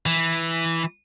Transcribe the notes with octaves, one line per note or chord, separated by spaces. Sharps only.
E3